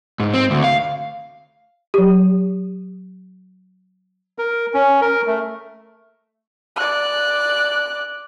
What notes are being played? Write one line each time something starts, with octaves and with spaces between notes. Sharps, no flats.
G#2
C4
D2
F5
F#3 G4
A#4
C#4
A#4
A3
D5 F#6